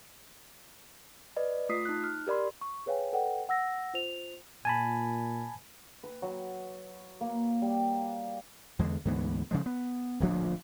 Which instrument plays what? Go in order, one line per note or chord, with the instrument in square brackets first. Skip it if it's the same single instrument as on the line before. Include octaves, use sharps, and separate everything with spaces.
[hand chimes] B4 D5 D#5
A3 F4 D#6 B6 C7
D#4 F#6
F6
G4 A#4 D5 B5 C6
[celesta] C#6
G#4 B4 C#5 F5 G5 G#5
A4 B4 D5 F#5 G5
F#5 E6 A#6
F4 C5 F7
[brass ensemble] A#2 [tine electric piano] G#5 A5 B5
[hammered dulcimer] B4
F#3
A#3
G3
[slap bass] E2 D3 G#3
D2 G#2 E3 B3
C#3 F3 G#3
B3
D1 A#1 F3 D4